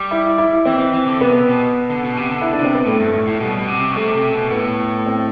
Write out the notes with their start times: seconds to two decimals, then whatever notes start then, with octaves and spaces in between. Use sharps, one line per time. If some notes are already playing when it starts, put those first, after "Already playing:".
Already playing: G3
0.11 E4
0.38 E4
0.65 E3 C4
0.79 E3
0.93 E3
1.07 D3
1.21 C3 B3
1.49 B2
1.90 D3
2.04 B2
2.17 C3
2.31 D3
2.41 E4
2.53 D4
2.59 C3
2.64 C4
2.75 B3
2.86 A2 A3
3.00 G2
3.14 A2
3.27 A2
3.40 B2 G3
3.58 B2
3.68 C3
3.91 B2
3.96 C3 A3
4.15 C3
4.33 B2
4.51 A2 B3
5.06 C4